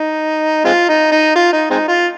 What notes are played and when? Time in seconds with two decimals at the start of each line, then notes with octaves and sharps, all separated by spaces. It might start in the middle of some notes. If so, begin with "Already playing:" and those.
Already playing: D#4
0.65 G#3 C4 F4
0.89 D#4
1.12 D#4
1.35 F4
1.53 D#4
1.70 G#3 C4 D#4
1.88 F4